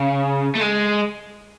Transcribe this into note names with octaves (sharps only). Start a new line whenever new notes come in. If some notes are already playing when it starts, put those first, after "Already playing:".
Already playing: C#3
A3
G#3